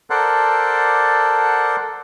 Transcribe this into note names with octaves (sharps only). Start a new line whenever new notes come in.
A4 A#4 C5 D5 F#5